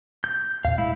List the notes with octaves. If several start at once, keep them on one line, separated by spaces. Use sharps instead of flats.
G6
E2 A#2 F5
G#3 E4